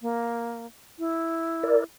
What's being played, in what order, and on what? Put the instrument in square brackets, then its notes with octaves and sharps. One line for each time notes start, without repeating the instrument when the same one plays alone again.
[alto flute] A#3
E4
[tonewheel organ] A#4 D5